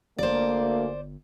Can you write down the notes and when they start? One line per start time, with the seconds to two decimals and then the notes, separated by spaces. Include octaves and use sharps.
0.18 G1 D2 A#3 C5 D5